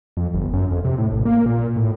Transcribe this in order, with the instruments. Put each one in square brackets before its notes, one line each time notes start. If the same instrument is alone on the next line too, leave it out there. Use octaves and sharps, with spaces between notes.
[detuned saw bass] F2
G1
F#2
F2
C3
A2
A1
A#3
A#2
A2